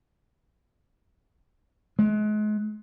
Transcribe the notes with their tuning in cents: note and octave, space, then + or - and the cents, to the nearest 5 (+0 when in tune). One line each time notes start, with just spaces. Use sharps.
G#3 +35